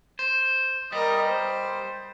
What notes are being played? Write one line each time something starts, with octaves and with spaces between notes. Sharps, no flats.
C5
G3 A#4 D#5
C5